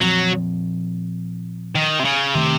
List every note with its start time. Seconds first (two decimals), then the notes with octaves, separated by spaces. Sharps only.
0.01 A#2 F3 F#3 C4
1.75 D#3
1.99 C3
2.04 C#3
2.34 C3 D#3 A3